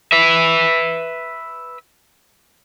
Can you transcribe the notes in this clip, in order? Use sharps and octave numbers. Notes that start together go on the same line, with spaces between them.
B4 E5